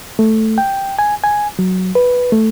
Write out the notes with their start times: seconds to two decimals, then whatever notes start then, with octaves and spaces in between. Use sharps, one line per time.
0.19 A3
0.58 G5
0.99 G#5
1.24 G#5
1.59 F#3
1.95 B4
2.32 A3